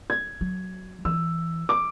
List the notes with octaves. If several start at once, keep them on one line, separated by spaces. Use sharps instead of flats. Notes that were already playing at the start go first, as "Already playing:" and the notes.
G#6
F#3
E3 E6
D6